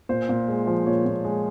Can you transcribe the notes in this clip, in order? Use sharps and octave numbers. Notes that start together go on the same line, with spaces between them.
A#2 C5
A#2
G#3
F3
A#2 C#5
A#2
G#3